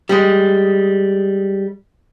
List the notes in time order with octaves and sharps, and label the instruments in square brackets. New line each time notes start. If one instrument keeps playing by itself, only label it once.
[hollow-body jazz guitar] G3 G#3